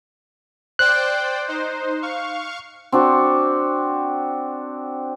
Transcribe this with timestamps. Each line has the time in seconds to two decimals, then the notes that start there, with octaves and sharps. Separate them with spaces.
0.79 C5 D5 G5 F#6
1.48 D#4 C5
2.02 F5 C#6
2.92 C4 D4 F#4